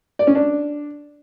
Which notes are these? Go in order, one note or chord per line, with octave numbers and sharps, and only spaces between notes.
D5
C#4
D4